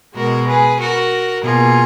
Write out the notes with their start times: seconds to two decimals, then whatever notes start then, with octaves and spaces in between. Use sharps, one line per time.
0.14 B2 G#3 F#4 A#4
0.47 G#4 B4
0.78 F#4 A#4
1.44 B2 A#3 F4 G#4